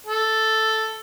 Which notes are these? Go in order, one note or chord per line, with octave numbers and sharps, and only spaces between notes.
A4